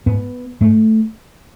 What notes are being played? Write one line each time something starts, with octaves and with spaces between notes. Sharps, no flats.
G#2 B3
G#2 A3